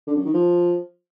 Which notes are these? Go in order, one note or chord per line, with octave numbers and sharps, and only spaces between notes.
D3
F#2
D#3
F3